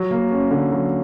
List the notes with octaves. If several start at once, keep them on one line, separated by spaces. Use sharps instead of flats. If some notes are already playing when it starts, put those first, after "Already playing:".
Already playing: F#3
A#3
C#4
D3
F#3